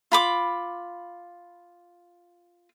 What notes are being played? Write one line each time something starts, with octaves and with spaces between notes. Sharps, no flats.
F4 B5 D6